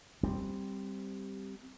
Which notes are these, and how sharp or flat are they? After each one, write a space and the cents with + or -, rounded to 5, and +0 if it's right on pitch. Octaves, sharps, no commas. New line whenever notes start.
G3 +0 C4 +0